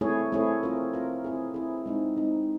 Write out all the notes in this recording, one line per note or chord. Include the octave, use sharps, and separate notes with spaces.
A3 C4 E4 G#4 C#5
A3 C4 E4 G#4 C#5
C4 F4 A#4
C4 F4 A#4
C4 E4 G#4
C4 E4 G#4
G#3 C4 D#4
G#3 C4 D#4